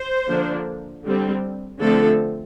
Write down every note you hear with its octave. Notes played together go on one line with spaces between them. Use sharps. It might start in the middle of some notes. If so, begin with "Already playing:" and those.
Already playing: C5
D3 F3 A#3 D4
D3 G3 C4
D3 F3 A3 C4 A4